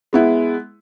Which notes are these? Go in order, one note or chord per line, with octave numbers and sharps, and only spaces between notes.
G#3 B3 E4